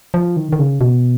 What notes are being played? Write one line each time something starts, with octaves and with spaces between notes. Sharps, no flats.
F3
D#3
D#3
C#3
B2